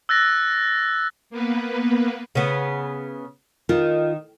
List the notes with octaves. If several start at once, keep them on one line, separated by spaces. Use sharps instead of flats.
E6 F#6 A6 A#6
A#3 B3 B4
C#3 B3
D#3 F4